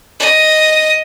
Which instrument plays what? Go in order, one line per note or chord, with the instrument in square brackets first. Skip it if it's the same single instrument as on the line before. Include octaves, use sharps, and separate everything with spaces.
[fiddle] D#5